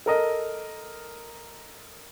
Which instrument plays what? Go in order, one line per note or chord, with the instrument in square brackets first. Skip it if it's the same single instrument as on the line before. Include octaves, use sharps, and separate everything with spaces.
[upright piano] A4 A#4 D#5